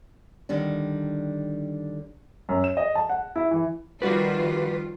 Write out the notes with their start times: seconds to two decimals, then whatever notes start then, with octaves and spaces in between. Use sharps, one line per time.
0.49 D3 D#3 G3 D4
2.49 F#2
2.64 E7
2.77 D#5
2.95 A5
3.09 F#5
3.36 E4
3.51 E3
4.02 D#3 F3 G3 F4 F#4 B4 D5